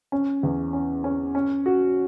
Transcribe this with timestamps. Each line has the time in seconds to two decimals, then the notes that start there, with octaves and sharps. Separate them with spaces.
0.12 C#4
0.43 E2
0.73 C#4
1.04 C#4
1.35 C#4
1.66 F#4